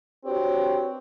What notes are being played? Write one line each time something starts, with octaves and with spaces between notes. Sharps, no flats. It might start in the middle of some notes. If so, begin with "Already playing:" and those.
C4 D4 F#4 G4 B4 C#5